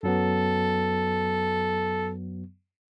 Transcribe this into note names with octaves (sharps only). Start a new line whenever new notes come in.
F#2 F#3 B3 A4